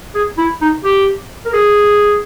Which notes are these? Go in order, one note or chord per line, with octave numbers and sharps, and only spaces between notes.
G#4
E4
D#4
G4
A#4
G#4